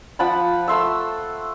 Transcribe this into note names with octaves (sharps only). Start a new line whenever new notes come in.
F3 F#5 A5 B5
A3 C6 E6